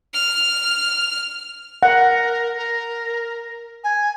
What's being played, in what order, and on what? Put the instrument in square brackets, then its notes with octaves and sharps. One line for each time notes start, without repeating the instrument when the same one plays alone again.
[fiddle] F6
[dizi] A#4 [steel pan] F#5
[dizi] A#4
G#5